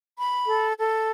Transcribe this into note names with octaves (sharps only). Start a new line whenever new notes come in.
B5
A4
A4